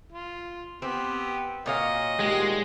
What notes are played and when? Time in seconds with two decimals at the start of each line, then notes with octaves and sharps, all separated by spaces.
0.12 F4
0.82 B3 C4 G4
1.66 A#2 F#4 C#5 D#5 F5
2.20 D#3 G3 G#3 G4